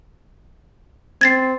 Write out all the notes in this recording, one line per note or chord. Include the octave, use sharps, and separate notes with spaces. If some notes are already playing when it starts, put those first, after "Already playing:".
C4 G#6 A6 C7